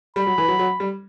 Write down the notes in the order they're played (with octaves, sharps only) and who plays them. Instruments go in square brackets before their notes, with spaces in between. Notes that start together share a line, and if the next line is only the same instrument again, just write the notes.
[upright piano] G3 [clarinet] B5
[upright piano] F#3
E3
F#3
F#3
G3